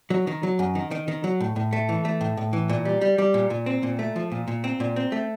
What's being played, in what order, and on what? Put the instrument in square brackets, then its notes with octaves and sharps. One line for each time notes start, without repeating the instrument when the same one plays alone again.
[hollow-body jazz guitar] F#3
D#3
F#3
F#2
D#3
D#3
D#3
F#3
A2
A2
A3
E3
A3
A2
A2
E3
A#2
G3
G3
G3
A#2
A#2
C4
A#2
A3
F3
A#2
A#2
C4
A#2
C4
A3